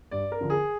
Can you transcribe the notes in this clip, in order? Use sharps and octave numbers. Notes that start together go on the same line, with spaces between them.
G2 D5
A#4
D3 F3
G#4